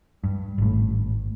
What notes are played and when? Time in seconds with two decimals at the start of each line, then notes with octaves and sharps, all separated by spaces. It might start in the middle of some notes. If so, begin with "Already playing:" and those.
0.24 G2
0.58 G#1 A2